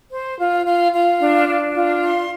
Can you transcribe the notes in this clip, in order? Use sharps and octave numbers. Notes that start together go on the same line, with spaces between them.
C5
F4
F4
F4
D4
D4
F4
C6